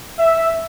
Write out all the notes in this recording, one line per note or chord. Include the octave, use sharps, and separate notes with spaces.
E5